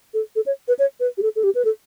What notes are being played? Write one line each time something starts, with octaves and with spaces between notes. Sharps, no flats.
A4
A4
C#5
B4
C#5
B4
G4
A4
A4
G4
B4
A4